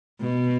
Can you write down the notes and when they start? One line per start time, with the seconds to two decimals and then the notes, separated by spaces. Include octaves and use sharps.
0.21 B2